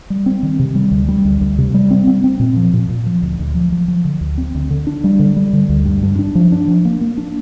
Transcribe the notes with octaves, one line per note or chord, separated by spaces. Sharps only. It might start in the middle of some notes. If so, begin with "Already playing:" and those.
G3
C4
D#3
C3
G3
D2
G3
D2
D2
C3
G3
C4
C4
C4
A#2
F3
A#2
A#2
F3
D2
D2
F3
F3
F3
D3
D2
C4
D2
D3
D4
G3
D3
G3
D3
D2
G2
G2
D4
F3
D4
F3
A#3
A#3
D4